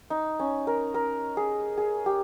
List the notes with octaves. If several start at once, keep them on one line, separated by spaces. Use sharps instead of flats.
D#4
C#4
A#4
A#4
G#4
G#4
G4